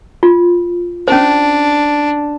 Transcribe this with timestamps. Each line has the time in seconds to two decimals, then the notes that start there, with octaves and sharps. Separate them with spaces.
0.23 F4
1.08 C#4 D4 C5